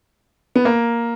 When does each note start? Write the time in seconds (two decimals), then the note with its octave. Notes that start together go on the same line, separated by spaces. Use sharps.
0.56 B3
0.65 A#3